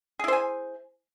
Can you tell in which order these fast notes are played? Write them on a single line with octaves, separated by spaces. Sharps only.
G#4 E4 C5 G#5